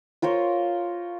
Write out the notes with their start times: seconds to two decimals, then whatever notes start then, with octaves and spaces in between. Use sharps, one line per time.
0.22 F4 A#4 C5 C#5